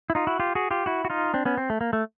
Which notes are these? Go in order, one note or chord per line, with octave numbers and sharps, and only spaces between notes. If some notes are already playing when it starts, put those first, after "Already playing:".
E4
D#4 F4
E4 F#4
F4 G4
F#4 G#4
F4 G4
E4 F#4
F#4
D#4 F4
C4 D4
B3 C#4
C4
A3
A#3
A3